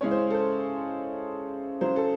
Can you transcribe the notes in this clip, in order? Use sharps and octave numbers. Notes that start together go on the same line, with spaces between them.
C#3 G#3 C#4 E4 C#5
C5
A4
C5
C#3 F#3 C#4 C5
A4